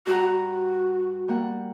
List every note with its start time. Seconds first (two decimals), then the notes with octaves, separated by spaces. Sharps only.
0.07 G2 F#4 F#5 A#5
0.20 F#4
1.28 G3 A#3 F#5